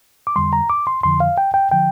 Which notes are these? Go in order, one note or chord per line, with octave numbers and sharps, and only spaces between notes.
D6
F2 D3 G3 C6
A#5
D6
C6
F2 D3 F3 C6
F5
G5
G5
D3 F3 G5